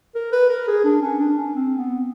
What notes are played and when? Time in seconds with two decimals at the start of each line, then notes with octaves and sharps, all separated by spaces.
0.15 A#4
0.32 B4
0.49 A#4
0.68 G#4
0.84 D4
1.02 C#4
1.19 D4
1.38 C#4
1.55 C4
1.78 B3